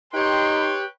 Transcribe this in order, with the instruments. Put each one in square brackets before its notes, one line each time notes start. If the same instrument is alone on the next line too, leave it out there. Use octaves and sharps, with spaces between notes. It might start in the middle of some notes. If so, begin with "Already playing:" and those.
[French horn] D#4 [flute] G4 [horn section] B4 C#5 G5 [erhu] C6